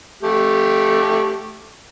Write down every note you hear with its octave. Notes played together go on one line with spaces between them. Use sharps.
A3 G4